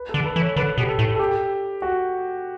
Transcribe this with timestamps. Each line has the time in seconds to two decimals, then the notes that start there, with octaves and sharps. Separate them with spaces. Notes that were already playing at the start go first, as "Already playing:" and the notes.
Already playing: B4
0.09 A4
0.14 D3
0.21 A4
0.25 B4
0.36 E3
0.41 C#5
0.56 D3 B4
0.78 B2 G4
0.88 A4
0.99 A2
1.15 A4
1.19 G4
1.82 F#4